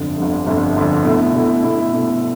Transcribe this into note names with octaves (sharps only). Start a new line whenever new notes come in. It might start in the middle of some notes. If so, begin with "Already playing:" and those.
Already playing: G1 F2 D3
G1 F2 D3
G1 F2 D3
G1 F2 D3
B2 A3 E4
B2 A3 E4
B2 A3 E4
B2 A3 E4